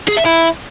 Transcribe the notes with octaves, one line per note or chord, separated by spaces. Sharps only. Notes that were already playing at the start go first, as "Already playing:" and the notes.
G#4
E5
E4